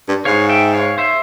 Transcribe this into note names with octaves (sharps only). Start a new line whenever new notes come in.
G2
G#2 C#5 F5
E5 G5
C#5 F5
C5 E5